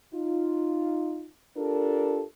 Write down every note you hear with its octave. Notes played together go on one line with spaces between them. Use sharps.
D#4 F4
D4 F4 G4 A4 A#4